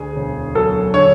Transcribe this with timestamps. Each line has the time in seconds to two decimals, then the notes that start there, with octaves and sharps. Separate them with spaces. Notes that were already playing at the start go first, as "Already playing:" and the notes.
Already playing: D2 G#4
0.16 E1
0.55 F#3 A4
0.94 D3 C#5